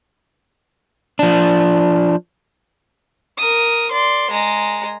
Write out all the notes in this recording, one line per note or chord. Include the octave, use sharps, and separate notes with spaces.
F3 D4
A#4 D#6
D5 C6
G#3 A#5